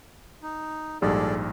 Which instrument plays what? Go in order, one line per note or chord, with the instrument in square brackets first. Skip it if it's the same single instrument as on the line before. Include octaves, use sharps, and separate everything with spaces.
[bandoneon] D#4
[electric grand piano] A#1 G#2 G3 [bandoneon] G#4 A4 D5